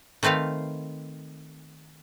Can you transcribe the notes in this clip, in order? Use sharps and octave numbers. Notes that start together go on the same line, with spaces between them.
D#3 A3 C4 B4 F5